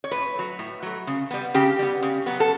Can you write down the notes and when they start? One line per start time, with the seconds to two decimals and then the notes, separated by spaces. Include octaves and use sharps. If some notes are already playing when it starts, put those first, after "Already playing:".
0.04 C#5
0.11 A2 B4
0.35 F#3 A3
0.59 A2
0.82 F#3 A3
1.07 C#3
1.31 G3 B3
1.54 C#3 G4
1.79 G3 B3
2.03 C#3
2.26 F#3 B3
2.40 A4